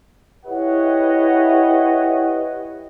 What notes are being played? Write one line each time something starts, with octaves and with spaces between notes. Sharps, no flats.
E4 G4 B4 C#5 D#5 F#5